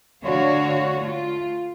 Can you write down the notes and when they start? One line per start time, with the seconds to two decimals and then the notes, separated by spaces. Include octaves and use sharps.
0.24 D3 A3 D4 F#4 C#5 F5
1.01 A3 F4